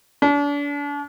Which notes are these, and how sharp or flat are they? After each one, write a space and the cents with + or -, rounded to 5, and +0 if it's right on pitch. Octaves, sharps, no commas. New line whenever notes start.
D4 -35